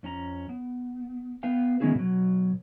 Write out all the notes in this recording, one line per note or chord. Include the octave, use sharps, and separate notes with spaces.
F2 C#4 G#5 A#5
B3
B3 B4 F5 G5
D#3 G#3 B3 C#4 E4 G#4
B2 F#3